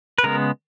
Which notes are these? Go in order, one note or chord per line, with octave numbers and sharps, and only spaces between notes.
B4
C#3 G#3 B3 A#4